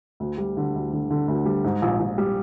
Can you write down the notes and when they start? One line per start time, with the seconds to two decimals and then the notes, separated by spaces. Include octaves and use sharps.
0.20 D2
0.38 G3
0.57 D3
0.75 D2
0.93 D3
1.10 D3
1.28 D2
1.46 G3
1.64 G#2
1.82 A#1
2.00 A#1
2.18 G3